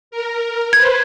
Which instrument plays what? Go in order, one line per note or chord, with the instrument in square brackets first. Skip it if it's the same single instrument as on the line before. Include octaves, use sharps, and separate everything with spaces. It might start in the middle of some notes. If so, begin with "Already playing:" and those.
[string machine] A#4
[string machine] B4 C5 [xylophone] G#6